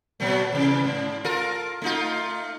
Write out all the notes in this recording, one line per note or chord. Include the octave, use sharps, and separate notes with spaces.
A#2 F#3 A3
E2 C3
G#2
F4 A4 A#4
A3 D#4 F4